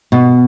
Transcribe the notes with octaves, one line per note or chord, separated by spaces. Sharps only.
B2